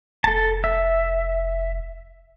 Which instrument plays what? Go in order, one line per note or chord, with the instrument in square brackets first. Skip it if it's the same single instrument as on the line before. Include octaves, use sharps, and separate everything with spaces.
[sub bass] F1 [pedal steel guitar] A4 A5
[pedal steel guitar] E5